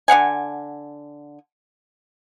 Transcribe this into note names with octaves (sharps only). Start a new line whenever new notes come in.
D3 F5 F#5 G#5